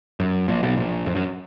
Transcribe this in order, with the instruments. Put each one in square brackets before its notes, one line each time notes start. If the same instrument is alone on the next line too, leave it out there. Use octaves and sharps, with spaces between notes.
[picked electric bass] F#2
A#1 A#2
B1 B2
A#1 A#2
F2
F#2